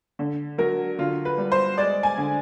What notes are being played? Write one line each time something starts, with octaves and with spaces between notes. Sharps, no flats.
D3
F#3 A#4
D3 F4
B4
G3
C5
G#3 D5
G#5
D3